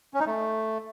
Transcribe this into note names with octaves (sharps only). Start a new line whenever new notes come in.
C#4
D#4
A3